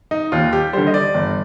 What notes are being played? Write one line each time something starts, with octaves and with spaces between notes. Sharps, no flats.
D#4
D#2 F4
G4
D3 G3 C5
D#5
D5
G1